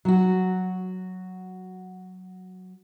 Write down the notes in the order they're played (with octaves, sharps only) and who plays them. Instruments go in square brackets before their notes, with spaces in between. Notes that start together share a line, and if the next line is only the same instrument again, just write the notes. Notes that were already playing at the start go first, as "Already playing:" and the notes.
[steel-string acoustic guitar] F#3 F#4